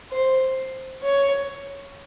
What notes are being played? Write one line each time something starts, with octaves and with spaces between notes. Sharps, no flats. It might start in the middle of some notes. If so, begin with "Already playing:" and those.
C5
C#5